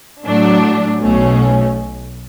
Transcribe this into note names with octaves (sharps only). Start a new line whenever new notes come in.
A2 F#3 A3 D4
B1 B2 A3 C#4